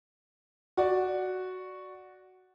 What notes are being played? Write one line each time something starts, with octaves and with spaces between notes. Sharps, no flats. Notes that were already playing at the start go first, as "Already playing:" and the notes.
F#4 D5